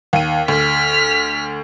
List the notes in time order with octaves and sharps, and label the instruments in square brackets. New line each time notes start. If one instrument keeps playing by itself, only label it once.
[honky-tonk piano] D#2 D#7
[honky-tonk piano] D2 [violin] F6 B6